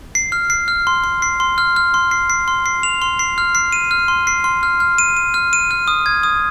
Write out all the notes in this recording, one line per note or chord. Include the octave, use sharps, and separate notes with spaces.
C7
F6
C7
F6
C6
C6
C7
C6
F6
F6
C6
C7
C7
C6
C7
F7
C6
C7
F6
C7
D#7
F6
C6
C7
C6
F6
F6
D#7
D#7
F6
D#7
F6
D#6
G#6
D#6